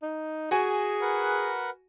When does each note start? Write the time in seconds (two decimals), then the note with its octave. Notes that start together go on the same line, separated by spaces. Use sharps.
0.02 D#4
0.51 F#4 G#4 G#5
1.01 A#4 B4 F#5